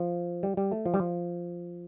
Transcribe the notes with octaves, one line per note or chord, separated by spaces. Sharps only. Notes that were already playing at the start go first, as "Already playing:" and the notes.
Already playing: F3
G3
G3
A3
F3
G3
F3